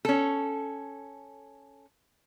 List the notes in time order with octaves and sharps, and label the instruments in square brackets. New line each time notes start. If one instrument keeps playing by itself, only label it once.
[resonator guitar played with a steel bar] C#4 A4